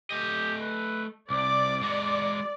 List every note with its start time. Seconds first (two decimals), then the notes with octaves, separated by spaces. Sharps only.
0.11 A3 G4 D#5
0.62 B4
1.30 C2 D5 D6
1.82 G#3 F#4 D6